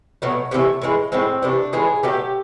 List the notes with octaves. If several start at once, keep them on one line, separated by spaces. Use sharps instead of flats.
B2 F#3 A3
C3 E3 A3 B3
A2 E3 G#3
A2 F3 G#3 C4
C3 E3 A3 D4
A2 E3 G#3 G#4
B2 F#3 A3 G4